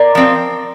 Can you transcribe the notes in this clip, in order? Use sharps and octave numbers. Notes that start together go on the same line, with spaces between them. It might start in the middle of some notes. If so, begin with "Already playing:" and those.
Already playing: A#4 D5
F3 C4